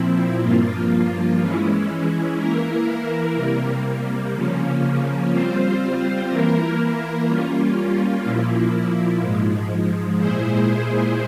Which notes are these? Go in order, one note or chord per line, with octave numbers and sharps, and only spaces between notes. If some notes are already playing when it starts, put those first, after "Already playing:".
Already playing: A#2 F3 C4 E4
G2 F3 A#3 F4
E3 G#3 C#4 E4
E3 A#3 E4 A#4
C3 G3 A#3
C#3 F3 A#3 C#4
G3 C4 F4 C5
E3 A#3 E4 A#4
G3 A#3 C#4 F4
A#2 F3 A#3 E4
G#2 F3 G#3
A#2 G#3 E4 G#4 C5